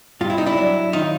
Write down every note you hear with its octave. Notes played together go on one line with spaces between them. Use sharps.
G2 F4
E4
D#4
D4 E4
F#3
D#3 D#4 F4